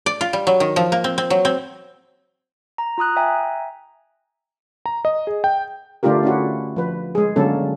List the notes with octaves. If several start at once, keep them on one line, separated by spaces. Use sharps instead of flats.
D5
F4
G3
F#3
D#3
F3
A#3
C4
C4
F#3
C4
A#5
F4 A#5 D#6 F#6
E5 G5 G#5 A#5
A#5
D#5
G#4
G5
D3 A3 D4 F4 G4 A#4
C#4 E4 F#4
F3 B4
G#3 G#4
D3 F#3 G#3 A#3 C#4 A4